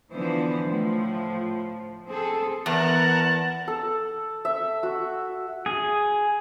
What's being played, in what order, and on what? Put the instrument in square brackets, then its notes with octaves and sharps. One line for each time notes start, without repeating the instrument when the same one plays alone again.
[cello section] D3 E3 F3 B3 D4 C5
A2 F3
C4 G#4 A4
[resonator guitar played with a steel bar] E2 [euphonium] B3 [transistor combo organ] A#4 F#5 [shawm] A5
[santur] A4
E5
F#4
[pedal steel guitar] G#4